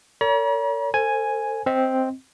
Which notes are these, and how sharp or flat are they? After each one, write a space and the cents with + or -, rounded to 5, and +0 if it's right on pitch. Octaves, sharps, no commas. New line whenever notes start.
A#4 -40 C#5 +40 A#5 +45
A4 +35 C5 +10 G#5 +0
C4 +0 D#5 +10